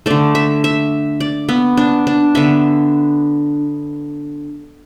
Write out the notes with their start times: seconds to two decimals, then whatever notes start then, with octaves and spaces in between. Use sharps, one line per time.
0.06 D3 A3 D5
0.35 E5
0.64 E5
1.20 D5
1.49 B3
1.77 D4
2.07 D4
2.35 D3 B3 E5